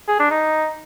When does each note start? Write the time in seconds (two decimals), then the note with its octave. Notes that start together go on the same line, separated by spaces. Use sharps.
0.08 G#4
0.20 D4
0.31 D#4